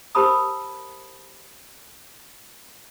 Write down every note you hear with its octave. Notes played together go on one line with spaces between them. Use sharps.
G4 A#4 C5 A5 B5 D#6